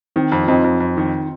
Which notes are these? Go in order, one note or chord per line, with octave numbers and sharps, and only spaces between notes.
D#3 C4
F2
F4
F2 C4 D#4
F2
F2
D#3